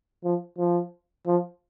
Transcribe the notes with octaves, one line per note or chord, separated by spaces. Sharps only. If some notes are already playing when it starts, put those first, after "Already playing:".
F3
F3
F3